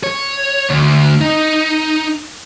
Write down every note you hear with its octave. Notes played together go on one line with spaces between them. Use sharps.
C#5
D2
D#4